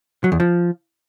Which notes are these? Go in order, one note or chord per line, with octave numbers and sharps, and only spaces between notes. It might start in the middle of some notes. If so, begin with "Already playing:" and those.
F#3
E2
F3